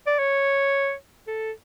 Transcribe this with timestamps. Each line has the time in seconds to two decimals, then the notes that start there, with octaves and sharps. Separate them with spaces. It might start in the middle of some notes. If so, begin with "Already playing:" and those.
0.07 D5
0.19 C#5
1.28 A4